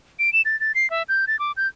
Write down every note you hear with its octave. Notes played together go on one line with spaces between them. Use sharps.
D7
E7
A6
A6
C7
E5
G6
A6
D6
G6